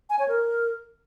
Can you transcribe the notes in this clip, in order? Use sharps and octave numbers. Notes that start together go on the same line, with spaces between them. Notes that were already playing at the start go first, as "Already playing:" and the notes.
G#5
C#5
A#4